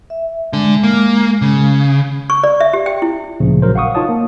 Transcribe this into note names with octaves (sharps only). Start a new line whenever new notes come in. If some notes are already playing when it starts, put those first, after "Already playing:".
E5
D3 G#3 D4
A#3
C#3
C#6
D5
E5
G4
G5
E4
D2 A#2 C#3 F3
A#1 F#3 A#4 C5
F5 F#5 C#6 D#6
D#4 F4 C#5 A5 D#6
A#3